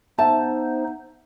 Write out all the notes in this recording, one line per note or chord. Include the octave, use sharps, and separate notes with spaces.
B3 D#4 C5 E5 A5